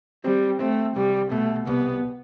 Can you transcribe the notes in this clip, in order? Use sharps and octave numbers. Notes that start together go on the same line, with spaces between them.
G3 C4
A3 C4
C2 G3
B2 A3
C2 B3